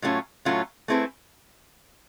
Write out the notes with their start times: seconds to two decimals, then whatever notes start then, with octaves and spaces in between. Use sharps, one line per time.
0.02 A2 F#3 A3 C#4 F4
0.45 A2 F#3 A3 C#4 F4
0.88 A3 C4 E4 G#4 B4